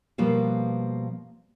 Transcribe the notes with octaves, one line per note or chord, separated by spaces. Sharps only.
B2 F3 G3 A#3 B3